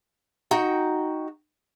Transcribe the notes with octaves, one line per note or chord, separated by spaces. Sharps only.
D#4 F#4 G5